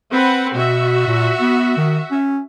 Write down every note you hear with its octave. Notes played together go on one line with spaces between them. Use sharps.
C4 B4 F#5
B2 F#4 E5
A#2
B3
D#3
C#4